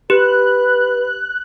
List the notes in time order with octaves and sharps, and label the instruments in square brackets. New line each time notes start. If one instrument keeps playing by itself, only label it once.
[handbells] G4 [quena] B4 [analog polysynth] F#6